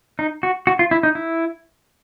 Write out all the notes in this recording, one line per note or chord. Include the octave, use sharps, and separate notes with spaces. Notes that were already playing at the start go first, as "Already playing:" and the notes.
D#4
F#4
F#4
F4
E4
D#4
E4